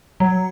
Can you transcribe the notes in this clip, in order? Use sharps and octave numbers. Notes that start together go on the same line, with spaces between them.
F#3